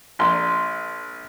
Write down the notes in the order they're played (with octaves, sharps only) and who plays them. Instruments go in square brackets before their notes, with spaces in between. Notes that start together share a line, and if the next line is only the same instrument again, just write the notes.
[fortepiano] A#1 C6